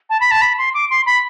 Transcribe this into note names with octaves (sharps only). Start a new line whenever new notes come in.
A5
B5
A5
B5
C6
D6
C6
B5